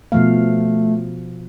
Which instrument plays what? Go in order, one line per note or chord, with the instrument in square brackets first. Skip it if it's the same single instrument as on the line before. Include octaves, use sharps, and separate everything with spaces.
[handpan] B2 F3 F5 [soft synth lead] A3